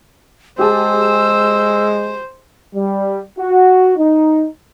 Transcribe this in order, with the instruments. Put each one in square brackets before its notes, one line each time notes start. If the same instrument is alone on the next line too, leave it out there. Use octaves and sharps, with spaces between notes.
[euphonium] G#3 [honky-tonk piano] G4 G#4 A5 [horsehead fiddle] C5 [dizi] E6
[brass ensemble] G3
F#4
D#4